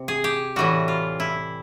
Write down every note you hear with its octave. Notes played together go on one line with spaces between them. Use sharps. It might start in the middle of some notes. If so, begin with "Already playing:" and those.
Already playing: C3
G#4
G4
A2 E3 G3 F#4
F4
E4